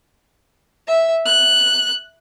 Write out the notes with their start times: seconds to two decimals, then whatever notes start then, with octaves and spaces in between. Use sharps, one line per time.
0.87 E5
1.26 F#6